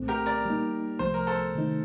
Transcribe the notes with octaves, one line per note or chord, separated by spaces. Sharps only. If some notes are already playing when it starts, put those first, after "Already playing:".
Already playing: C2 A#2 A3 C4
G4 A#4
A#4 D5
G3 A#3 D#4
C2 C3 F3 A3 C5
A#4
A4 C5
C3 D#3 A3 D#4